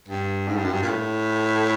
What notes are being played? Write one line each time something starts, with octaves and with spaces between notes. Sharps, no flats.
G2
G#2
G2
F#2
G2
A#2
A2